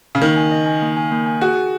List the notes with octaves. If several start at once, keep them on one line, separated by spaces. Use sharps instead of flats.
C#3
D#3 A#3
G#5
D#5
G#5
A#3
G#5
A#3
G#5
F#4 G#4
G#4